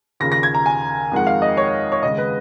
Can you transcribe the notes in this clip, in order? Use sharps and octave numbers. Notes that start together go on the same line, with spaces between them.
D#2 C#3 F3 A#6
A#6
G#6
A#5
G#5
F2 D#3 G#3 F#5
F5
D#5
C#5
C#5
D#2 C#3 G#3 D#5
B4